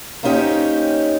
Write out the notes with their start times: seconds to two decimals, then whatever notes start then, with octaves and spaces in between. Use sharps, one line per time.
0.23 A#3 C4 C#4 D#4 G4 C#5